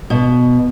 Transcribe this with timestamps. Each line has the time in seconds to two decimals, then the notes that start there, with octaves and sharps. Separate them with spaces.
0.10 B2